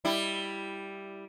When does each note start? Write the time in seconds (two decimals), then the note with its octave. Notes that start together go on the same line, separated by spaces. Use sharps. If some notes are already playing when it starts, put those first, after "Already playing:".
0.05 G3 E4